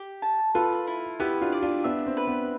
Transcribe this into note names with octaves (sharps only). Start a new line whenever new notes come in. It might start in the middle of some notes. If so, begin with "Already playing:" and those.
Already playing: G4
A5
F4 A4 B4
E4
B3 E4 G4
D4 F4
D5
D4 F4
B3 D4 E5
C4
B4
B3